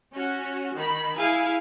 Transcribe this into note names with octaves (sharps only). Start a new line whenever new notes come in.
C#4 F#4
D#3 B5
E4 G#4 F5 G#5